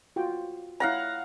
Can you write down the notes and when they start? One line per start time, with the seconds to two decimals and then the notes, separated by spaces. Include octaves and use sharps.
0.16 F4 F#4 G5
0.80 E4 C#5 F5 F#5 A#5